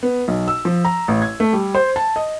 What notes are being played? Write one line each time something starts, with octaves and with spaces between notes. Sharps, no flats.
B3
B1
E6
F3
A#5
A1
G#6
A3
G3
C5
A5
D#5